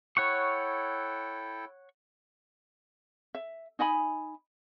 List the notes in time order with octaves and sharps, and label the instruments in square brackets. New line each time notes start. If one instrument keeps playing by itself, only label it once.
[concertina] E4 A4 G5 [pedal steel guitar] C#5 F#5 C#6
[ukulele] E5
D#4 D#5 G#5 B5